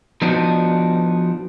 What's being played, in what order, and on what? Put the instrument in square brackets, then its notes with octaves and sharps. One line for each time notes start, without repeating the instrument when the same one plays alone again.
[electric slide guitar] F3 B3 D4 D#4 F#4